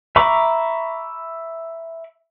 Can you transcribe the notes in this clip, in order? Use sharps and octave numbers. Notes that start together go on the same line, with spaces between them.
E5 A#5 B5 C#6 D6